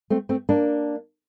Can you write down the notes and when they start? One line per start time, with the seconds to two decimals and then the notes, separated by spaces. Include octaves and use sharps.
0.10 A3 C4
0.29 A3 C4
0.49 A#3 D4